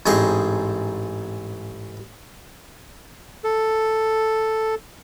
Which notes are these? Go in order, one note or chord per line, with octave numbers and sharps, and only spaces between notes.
A1 G#2 C4 G#4 D#5
A4